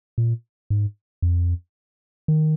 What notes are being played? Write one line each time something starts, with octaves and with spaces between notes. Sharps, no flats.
A#2
G#2
F2
D#3